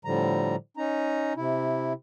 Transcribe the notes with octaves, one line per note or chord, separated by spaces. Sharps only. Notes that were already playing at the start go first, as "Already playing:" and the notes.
A2 D3 F3 G3 A#5
C#4 D#4 A#5
C3 E4